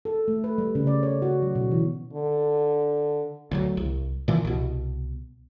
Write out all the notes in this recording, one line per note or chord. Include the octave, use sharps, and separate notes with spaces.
A4
A3
B4
G3
C#3
D5
C#5
F#4
F#3
B2
E3
D3
D2 F3 F#3
C2
A#2 E3 F3
C2 B2